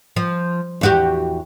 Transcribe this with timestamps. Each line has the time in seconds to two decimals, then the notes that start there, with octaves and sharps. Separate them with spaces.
0.16 F3
0.81 E2 F#4 G4